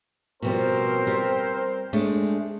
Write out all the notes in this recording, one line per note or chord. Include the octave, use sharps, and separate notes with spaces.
B2 F3 G3 C4 A#4 C5
G3
G#3 A3 D4